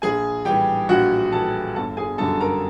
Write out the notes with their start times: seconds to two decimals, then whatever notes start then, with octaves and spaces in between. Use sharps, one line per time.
0.02 A#1 G#4 G#5
0.45 A2 E3 G3 G4 G5
0.89 A#1 F#4 F#5
1.32 A2 E3 G3 A4 A5
1.75 G1 A4 A5
1.97 G#4 G#5
2.18 F#2 D3 G3 A4 A5
2.41 A#4 A#5